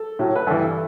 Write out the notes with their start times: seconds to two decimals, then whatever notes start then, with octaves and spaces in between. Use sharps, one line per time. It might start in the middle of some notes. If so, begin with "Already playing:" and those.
Already playing: A4
0.19 A2 F#3
0.36 B4
0.47 G2 E3 A4